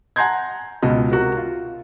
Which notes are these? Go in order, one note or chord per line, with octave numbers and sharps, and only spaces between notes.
F#5 G#5 A#5 C6 G6 G#6
C#2 B2 D#5
C3 F#4 A#4
F4